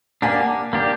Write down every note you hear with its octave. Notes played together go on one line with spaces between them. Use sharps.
A#3 D4 G4 F#5 G#5
A#3 D4 G4